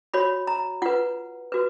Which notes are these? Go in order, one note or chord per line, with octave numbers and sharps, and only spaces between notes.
F#4 C#5 B5
A#5
F4 B4 F#5
F#4 B4